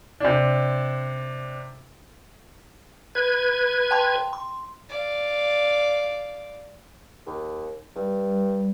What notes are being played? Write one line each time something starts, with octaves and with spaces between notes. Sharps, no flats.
C3 D4
B4 G#6
G5 A5 C6
C6
D5 F5
D#2
G2 G3